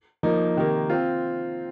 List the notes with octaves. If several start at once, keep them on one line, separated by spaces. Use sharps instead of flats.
F3 A#3 D#4
C3 D#3 A#3
C4 F4